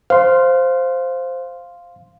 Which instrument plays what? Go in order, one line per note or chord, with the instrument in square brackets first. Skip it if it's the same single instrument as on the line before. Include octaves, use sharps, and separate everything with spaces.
[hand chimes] C5 [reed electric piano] F5 C6